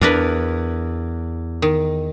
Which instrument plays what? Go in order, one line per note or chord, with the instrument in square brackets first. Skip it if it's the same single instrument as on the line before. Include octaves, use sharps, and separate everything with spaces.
[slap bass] E2 [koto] D4 A#4 B4
[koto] D#3